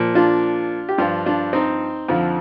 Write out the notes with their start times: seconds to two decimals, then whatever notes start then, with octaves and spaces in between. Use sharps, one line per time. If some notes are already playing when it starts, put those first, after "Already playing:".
Already playing: A#2 F3
0.15 D4 F4
0.89 G4
0.98 G2 F3 D4 F4
1.26 D4 F4
1.53 C4 D#4
2.08 F2 D3 F3